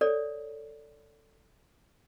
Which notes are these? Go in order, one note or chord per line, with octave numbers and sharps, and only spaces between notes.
A4 C#5 D5